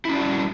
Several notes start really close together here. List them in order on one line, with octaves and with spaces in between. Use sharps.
E4 C#4 D4 F#4 G3